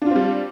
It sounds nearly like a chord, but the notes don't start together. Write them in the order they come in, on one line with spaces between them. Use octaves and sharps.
D4 F4 C4 G3